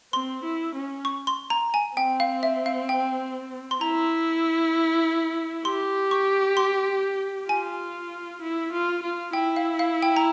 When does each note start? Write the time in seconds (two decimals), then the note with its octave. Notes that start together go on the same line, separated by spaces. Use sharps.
0.13 C4 C6
0.43 E4
0.74 C#4
1.05 C#6
1.27 C6
1.50 A#5
1.74 G#5
1.96 C4 G5
2.20 F5
2.43 E5
2.66 F5
2.89 G5
3.71 C6
3.81 E4 A#5
5.65 G4 C6
6.11 C#6
6.57 C6
7.49 F4 G#5
8.42 E4
8.72 F4
9.03 F4
9.33 E4 G5
9.56 F5
9.79 F5
10.02 G5
10.16 A#5